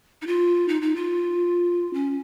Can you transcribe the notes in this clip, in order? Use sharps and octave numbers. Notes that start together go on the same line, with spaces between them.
D#4
F4
D#4
D#4
F4
C#4